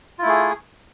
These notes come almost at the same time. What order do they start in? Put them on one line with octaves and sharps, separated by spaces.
F4 E4 A3 G#4